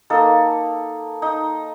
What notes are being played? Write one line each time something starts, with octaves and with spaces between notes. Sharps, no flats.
A#3 D#4 A4
D#4